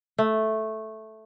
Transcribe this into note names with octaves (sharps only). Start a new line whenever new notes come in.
A3